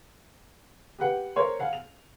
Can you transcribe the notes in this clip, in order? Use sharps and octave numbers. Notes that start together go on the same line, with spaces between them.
G4 B4 F#5 G5
A#4 C5 C#5 C6
F5 F#5 G#5
F7